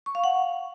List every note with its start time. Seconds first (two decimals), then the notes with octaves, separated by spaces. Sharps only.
0.06 C#6
0.15 F5
0.24 F#5